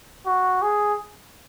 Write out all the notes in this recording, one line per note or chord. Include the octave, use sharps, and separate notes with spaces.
F#4
G#4